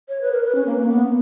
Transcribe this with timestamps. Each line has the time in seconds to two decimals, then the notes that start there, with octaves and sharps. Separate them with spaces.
0.09 C#5
0.21 B4
0.32 A#4
0.44 B4
0.55 C#4
0.66 A#3
0.78 A#3
0.89 B3